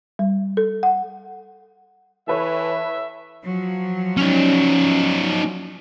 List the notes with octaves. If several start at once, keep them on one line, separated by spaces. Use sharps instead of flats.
G3
A4
F#5
E3 A4 B4 C#5 E5
F3 F#3
C#4 D#4